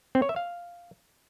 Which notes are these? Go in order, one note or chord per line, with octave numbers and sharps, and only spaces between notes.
C4
C#5
E5
F5